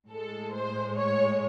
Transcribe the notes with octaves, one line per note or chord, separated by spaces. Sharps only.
A2 G#3 A4
C5
C#5